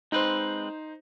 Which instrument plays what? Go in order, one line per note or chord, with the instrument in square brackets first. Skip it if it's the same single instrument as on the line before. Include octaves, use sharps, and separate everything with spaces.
[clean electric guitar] G#3 C4 B4 [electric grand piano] D#4 C5